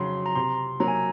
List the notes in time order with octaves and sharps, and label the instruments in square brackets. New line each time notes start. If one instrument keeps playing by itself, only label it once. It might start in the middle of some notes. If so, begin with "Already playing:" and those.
Already playing: [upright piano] F2 C#3 F#3 [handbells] C6
[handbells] A#5
[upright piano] C3 [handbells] C6
[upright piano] F#3 A#3 [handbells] A#5
[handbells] G#5
A#5